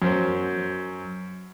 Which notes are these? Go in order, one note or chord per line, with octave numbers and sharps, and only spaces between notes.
F#2 C5